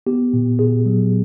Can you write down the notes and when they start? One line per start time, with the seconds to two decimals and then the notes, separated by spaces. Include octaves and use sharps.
0.06 B3 G4
0.33 A#2
0.59 A#2 G#4
0.86 F#3